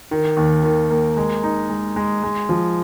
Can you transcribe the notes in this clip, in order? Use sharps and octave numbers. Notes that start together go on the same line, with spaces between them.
D#3
D#2
D#3
A#3
G#3
D#4
G#3
G#3
G#3
F3